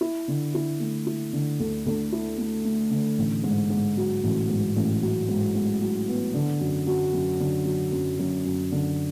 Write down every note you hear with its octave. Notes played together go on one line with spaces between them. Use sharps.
E4
D3
E4
A3
E4
D3
D2
D2
E4
A3
A3
D3
A1
G#2
G#2
F#3
A1
G#2
A1
F#3
G#2
G#2
F#3
B3
D3
F#2
F#3
F#2
D3
F#3
F#2
F#2
F#2
D3